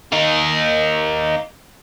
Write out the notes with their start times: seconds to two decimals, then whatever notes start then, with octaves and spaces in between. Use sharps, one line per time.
0.12 A#3 D#4